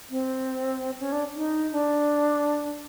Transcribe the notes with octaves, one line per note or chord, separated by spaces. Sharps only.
C4
C#4
D4
D#4
D4